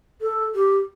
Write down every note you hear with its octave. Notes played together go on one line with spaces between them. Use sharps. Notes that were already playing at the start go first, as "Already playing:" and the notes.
A4
G4